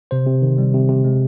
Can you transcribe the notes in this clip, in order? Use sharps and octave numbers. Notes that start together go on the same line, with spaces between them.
C3 C5
C3
D#3
G3
C3
C3
G#3